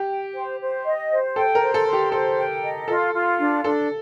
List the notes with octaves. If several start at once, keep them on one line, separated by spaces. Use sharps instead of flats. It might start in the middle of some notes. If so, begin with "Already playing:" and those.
Already playing: G4
G5
C5
C5
D#5
C5
A4 G5
A#4
C5
A4
C5
G4
A4 C5
G5
D#5
F4 A4
F4
D4
D4 A4